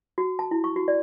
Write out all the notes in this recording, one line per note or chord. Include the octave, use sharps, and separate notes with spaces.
F#4
A5
E4
C#6
F#4
D5